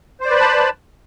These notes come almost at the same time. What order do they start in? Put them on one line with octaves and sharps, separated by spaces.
C5 D5 B4 B5 A5